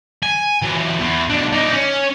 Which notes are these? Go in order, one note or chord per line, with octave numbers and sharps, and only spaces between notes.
G#5
E3 F#3
E2
B2 D4
D#4 D5
C#4